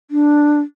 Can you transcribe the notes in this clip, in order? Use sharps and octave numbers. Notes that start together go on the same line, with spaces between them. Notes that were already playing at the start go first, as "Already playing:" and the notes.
D4